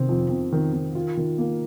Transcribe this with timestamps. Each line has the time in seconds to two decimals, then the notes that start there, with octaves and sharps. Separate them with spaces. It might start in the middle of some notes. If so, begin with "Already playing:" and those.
Already playing: C3 D#3 C4
0.09 F2
0.30 C4
0.52 D#3
0.73 D#3
0.95 F4
1.17 D#3
1.38 A#3